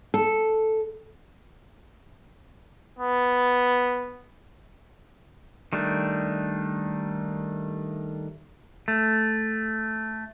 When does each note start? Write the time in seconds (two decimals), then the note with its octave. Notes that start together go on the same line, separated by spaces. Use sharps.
0.14 A4
2.99 B3
5.73 D#3 G3 A3 D4
8.88 A3